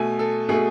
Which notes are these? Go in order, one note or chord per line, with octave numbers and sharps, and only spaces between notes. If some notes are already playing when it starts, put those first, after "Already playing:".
Already playing: B2 A3 G#5
A4
B2 A3 G#4